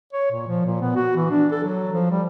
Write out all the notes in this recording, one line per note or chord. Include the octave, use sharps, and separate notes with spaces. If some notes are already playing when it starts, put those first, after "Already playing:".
C#5
A#2
F3
A#2
B3
F#4
E3
D4
A4
F#3
F3
G3